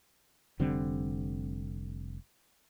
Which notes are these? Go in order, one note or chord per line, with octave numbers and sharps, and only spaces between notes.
F1 D3 G3 C4